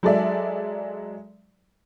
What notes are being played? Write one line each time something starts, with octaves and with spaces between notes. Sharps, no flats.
F#3 G#3 A4 D5 E5